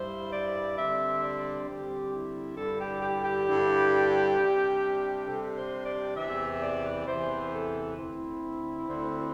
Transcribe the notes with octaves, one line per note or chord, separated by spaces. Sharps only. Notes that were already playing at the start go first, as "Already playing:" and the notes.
Already playing: G2 G3 E4 C5
D5
D3 G3 C4 E5
D5
D3 G3 C4 G4
E4
G2 D3 G3 E4 A4
G4
G4
G4
G2 D3 G3 E4
C3 G3 D4
C3 G3 D4 A4
C5
D5
E2 C3 E3 E5
D5
E2 C3 E3 C5
C5
A4
D2 D3 C4 E4
D2 D3 C4